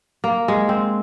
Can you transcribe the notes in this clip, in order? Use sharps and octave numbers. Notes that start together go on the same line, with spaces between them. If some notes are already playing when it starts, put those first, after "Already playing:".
A#3
G#3
C4